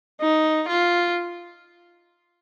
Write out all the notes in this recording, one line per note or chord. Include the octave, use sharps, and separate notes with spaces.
D#4
F4